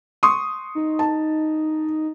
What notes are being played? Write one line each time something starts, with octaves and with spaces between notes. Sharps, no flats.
C6 C#6 D#6
D#4
A5